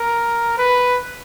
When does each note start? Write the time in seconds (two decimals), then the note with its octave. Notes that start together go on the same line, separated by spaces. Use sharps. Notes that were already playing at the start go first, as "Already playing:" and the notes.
Already playing: A#4
0.58 B4